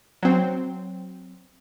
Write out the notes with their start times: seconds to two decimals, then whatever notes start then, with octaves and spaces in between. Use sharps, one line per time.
0.23 F#3 C4